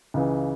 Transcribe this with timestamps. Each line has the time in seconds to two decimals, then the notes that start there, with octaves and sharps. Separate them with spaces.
0.14 C#2 C#3 E3